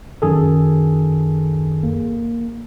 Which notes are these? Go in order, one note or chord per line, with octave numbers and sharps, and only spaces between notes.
F#2 D#3 G#4 A4
A#3